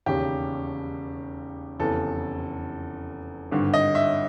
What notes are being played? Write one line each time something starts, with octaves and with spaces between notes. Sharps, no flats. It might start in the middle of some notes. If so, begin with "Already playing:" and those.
E1 D#2 C#3 G4
F1 E2 C#3 E3 A4
G#1 G2 D3
D#5
E5